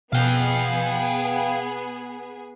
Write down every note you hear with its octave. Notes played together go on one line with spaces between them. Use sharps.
B2 B3 G#4 F5 G5